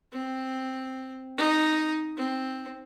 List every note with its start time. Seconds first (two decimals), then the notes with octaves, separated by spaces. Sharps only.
0.13 C4
1.38 D#4
2.17 C4